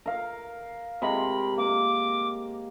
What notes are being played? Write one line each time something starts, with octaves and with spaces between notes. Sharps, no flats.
A#4 F5
C3 G#3 A#4 B5
A#3 D6